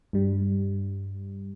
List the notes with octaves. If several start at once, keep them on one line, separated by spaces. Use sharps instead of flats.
G2 G3